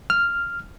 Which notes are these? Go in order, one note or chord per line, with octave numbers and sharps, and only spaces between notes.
F6